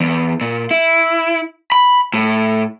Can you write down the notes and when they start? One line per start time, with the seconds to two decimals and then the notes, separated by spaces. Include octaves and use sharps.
0.01 E2
0.41 A#2
0.71 E4
1.72 B5
2.14 A2